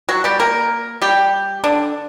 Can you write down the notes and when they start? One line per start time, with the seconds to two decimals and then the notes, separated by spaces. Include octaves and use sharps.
0.09 F#3 F#4
0.24 G3 G4
0.39 A#3 A#4
1.02 G3 G4
1.64 D3 D4